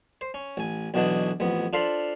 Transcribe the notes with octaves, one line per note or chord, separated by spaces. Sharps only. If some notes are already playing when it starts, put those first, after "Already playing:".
C5
C#4
A1 G#5
B1 B2 D3 E3 D4 D#5
A1 F2 B3
D4 F4 A4 C5 F5 B5